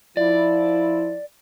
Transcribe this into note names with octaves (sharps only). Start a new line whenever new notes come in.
F3 E4 D5